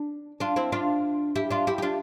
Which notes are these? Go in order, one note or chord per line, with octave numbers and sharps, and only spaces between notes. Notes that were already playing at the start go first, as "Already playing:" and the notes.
Already playing: D4
D4 F4
C4 E4
D4 F4
E4 G4
D4 F4
E4 G4
G4
D4 F4